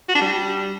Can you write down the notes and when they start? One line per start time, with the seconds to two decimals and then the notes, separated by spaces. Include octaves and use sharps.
0.09 F#4
0.15 D4
0.21 G3